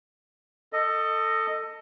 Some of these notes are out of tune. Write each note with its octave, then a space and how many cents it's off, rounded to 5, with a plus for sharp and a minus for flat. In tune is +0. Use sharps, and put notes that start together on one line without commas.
A4 +20 D#5 -5